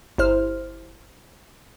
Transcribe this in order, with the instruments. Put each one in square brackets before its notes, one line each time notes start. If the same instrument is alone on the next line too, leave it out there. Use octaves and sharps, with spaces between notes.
[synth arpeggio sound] G1 E4 C5 F6